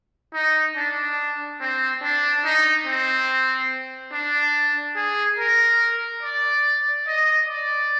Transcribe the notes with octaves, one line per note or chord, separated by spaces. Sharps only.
D#4
D4
C4
D4
D#4
C4
D4
G#4
A#4
D5
D#5
D5